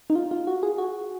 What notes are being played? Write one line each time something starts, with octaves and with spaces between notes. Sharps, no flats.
D#4
F4
F4
F#4
G#4
F#4